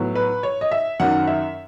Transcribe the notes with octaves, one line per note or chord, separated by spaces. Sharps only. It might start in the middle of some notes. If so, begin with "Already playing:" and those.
Already playing: A2 F#3 B3
B4
C#5
D#5
E5
F#2 D#3 F#3 F#5
E5